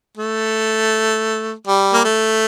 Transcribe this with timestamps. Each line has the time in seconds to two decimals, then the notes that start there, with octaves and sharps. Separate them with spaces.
0.17 A3
1.67 G3
1.93 A#3
2.04 A3